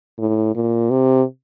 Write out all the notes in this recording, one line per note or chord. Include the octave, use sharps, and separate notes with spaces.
A2
A#2
C3